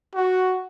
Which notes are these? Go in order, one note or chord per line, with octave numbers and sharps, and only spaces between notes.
F#4